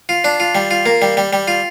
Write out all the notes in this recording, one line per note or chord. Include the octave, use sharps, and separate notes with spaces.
F4
D4
F4
G3
F4
A#3
G3
G3
G3
F4